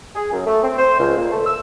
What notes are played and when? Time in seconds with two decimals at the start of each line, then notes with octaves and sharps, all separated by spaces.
0.16 G#4
0.32 F#2
0.46 A3
0.63 C4
0.78 C5
0.99 C#2
1.16 A#2
1.31 A3
1.45 E6